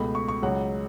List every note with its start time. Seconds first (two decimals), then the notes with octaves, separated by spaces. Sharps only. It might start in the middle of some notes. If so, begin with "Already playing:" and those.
Already playing: C#2 B2 A3 B5
0.15 C#6
0.28 C#6
0.42 C#2 C#3 F#3 F#5